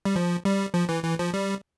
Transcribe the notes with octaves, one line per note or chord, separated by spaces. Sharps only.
G3
F3
G3
F3
E3
E3
F3
G3